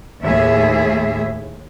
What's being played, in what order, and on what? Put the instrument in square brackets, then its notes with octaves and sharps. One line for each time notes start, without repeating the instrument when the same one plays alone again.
[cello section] D#2 A2 G#4 E5